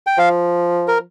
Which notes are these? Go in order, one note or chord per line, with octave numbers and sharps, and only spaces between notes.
G5
F3 F5
A#4